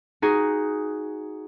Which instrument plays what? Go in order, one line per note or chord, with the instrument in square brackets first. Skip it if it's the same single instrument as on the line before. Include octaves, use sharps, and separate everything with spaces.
[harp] D#4 F#4 G#4